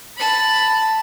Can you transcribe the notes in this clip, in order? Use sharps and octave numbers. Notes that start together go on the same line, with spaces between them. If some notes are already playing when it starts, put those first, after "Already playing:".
A5 B5